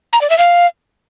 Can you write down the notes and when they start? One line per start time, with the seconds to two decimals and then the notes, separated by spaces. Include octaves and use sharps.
0.13 A#5
0.21 D5
0.30 E5
0.38 F5